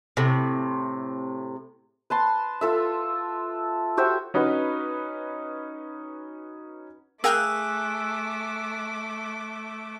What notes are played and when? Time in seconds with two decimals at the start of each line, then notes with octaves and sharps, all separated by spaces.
0.17 A2 C3
2.10 B4 A5 C6
2.61 F4 A4 E5
3.97 F#4 G4 C5 E5
4.34 C#4 D#4 F#4 B4
7.24 A3 G#4 A#4 F5 G5 D6 E6 F#6